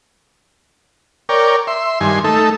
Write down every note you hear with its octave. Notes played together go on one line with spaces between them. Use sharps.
A#4 C#5 D5 G5
E5 C6
G2 D#3 G#5 C6
A3 D#4 A4